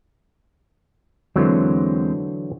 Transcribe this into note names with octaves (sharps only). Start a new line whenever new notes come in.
E2 D3 E3 F#3 G#3 C4